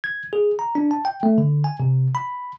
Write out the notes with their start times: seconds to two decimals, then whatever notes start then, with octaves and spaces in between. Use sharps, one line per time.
0.04 G#6
0.33 G#4
0.59 A#5
0.75 D4
0.91 A5
1.05 G5
1.23 A3
1.38 D3
1.64 G#5
1.80 C3
2.15 B5